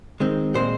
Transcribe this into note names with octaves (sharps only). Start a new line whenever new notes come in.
D#3 G#3 C4
A#2 G#3 C4 C5